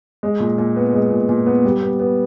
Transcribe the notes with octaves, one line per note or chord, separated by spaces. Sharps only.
G#3
A#2
A#2
B3
G#3
A#2
A#2
B3
G3
B3
B3